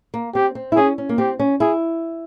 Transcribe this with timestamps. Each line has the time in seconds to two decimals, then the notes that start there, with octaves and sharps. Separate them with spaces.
0.14 A#3
0.35 C4 G4
0.55 C4
0.72 E4
0.76 C#4 G#4
0.98 C#4
1.09 A#3
1.18 C4 G4
1.39 C#4
1.60 E4 G#4